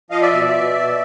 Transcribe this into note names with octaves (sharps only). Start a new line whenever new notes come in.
F3 D#5 F5
D5 E5
B2
B2
B2